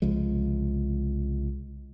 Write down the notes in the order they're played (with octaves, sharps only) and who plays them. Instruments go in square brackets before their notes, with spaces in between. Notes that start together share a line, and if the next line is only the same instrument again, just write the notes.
[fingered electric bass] C2 C#3 F3 G#3